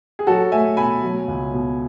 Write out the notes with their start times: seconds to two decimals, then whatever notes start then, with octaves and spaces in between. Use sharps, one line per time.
0.19 G#4
0.27 F#3 F#4 A4
0.52 A3 E5 G#5
0.77 B2 G#5 B5
1.03 F#3
1.28 C#2
1.53 B2